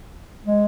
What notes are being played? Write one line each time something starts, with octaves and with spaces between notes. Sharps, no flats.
G#3